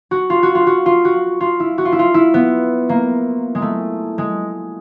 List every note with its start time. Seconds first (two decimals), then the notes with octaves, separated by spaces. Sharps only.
0.11 F#4
0.30 F4
0.43 F#4
0.55 F4
0.67 F#4
0.86 F4
1.05 F#4
1.41 F4
1.60 E4
1.78 F#4
1.85 F4
1.92 E4
1.99 F4
2.14 E4
2.34 B3
2.89 A#3
3.55 G#3
3.62 A3
4.18 G#3